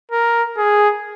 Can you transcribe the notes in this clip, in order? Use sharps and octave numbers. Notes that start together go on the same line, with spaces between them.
A#4
G#4